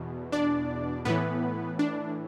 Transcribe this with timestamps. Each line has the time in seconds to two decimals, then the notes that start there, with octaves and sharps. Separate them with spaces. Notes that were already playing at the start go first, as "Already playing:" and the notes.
Already playing: E2 B2
0.32 D4 D5
1.05 A2 E3 B3 B4
1.79 D4